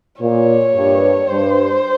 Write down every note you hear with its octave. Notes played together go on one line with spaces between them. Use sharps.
A#2 C#5
G2
G2 C5